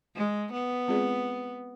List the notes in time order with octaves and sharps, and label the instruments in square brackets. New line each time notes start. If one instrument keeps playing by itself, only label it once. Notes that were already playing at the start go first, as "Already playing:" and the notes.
[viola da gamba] G#3
B3
[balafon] G#3 C4 F4 G#4 D5